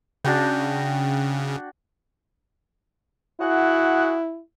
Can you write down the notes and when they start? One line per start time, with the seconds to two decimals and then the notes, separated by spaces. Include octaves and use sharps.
0.25 C#3 D4 F#4 G5
3.40 E4 F#4 G#4 F#5